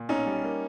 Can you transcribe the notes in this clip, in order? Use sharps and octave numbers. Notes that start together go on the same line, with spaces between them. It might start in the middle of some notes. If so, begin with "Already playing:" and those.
Already playing: A#2
B1 C#4 D#4
G3
A#3